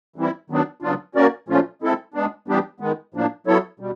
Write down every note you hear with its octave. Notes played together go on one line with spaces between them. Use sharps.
E3 G3 C4 E4
D#3 F#3 B3 D4
C#3 F#3 B3 D4 F4
A#3 C#4 F#4 A#4 D5
A#2 F3 A3 C#4 F4
G#3 C4 E4 A4
G#3 B3 D4
E3 G3 B3 D4 G4
D#3 G#3 B3
A2 F3 A#3 D4
F#3 B3 E4 A4 C#5
B2 G3